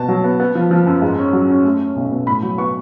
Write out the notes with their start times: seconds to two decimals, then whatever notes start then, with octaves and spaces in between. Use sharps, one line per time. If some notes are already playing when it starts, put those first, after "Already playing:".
Already playing: B2 B3 A5
0.09 F#3
0.24 B3
0.40 B3
0.55 F3
0.71 F3
0.87 F#2
1.02 G#2
1.18 C#4
1.33 F#3
1.49 C#4
1.64 A3
1.80 C#4
1.96 B1
2.11 B2
2.27 A2 B5
2.43 F#3
2.58 B3 C#6